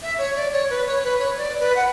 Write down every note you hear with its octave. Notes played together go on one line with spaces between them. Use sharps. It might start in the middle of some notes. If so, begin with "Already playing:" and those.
E5
C#5
D5
C#5
B4
C#5
B4
C#5
D5
B4
F#5